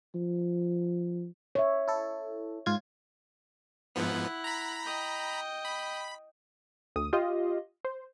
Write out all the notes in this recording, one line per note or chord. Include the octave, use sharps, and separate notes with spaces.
F3
C#5 E5
E4 A4
G#2 F4 G#6
G#2 F3 B3 E4 F#5
A#5 B5
D#5 G5
B5
D2 D#6
F4 G4 D#5
C5